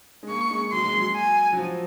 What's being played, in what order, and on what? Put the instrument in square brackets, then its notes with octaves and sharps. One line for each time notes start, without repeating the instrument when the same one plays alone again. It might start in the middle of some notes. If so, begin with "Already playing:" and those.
[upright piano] G#3
[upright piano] A#3 [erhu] C#6
[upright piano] G#3
[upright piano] F#3 [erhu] C6
[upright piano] G#3
F#3
[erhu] G#5
[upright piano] F#3
F3